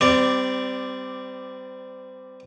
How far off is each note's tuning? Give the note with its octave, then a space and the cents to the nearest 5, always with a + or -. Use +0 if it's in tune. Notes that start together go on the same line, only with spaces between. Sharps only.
G3 +0 C4 -25 D5 +0